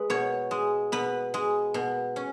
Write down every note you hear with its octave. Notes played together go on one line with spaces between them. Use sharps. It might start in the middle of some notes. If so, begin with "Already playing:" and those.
Already playing: G#3 B4
B2 C#5
G#3
B2 B4
G#3
B2
C#4